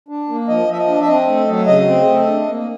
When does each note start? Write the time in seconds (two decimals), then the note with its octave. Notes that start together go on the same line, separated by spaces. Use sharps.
0.09 D4
0.28 A#3
0.48 F3 D#5
0.68 F3 E5
0.78 D#5
0.87 D4
1.01 E5
1.07 C4 D#5
1.27 A3
1.47 F#3
1.67 C#3 D#5
1.87 C4
2.07 A3
2.26 D4
2.47 A#3